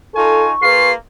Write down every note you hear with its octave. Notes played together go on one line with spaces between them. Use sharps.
D#4 F4 A4 G#5 C#6
A#3 F4 G#4 B4 C7